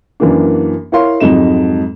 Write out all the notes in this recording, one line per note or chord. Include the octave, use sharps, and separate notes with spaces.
F#2 E3 A#3 D4
E4 A#4 C#5 F5 C6
F2 G#2 F#3 D#4 E7